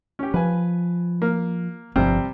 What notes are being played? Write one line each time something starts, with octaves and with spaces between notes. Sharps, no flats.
C#4 G4
F3 B4 G#5
A#3
G1 G2 C3 F3 G3 C4